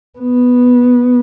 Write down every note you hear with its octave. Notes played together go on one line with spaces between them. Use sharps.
B3